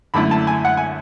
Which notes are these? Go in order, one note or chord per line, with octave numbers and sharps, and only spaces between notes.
F#2 D3 A3 E4 B5
A5
G#5
F#5
G#5